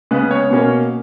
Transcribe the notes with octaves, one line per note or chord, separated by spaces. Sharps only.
C#3 G#3 B3 B4
C#5
B2 A#3 C#4